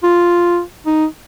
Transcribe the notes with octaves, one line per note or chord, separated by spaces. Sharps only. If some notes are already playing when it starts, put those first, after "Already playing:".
F4
D#4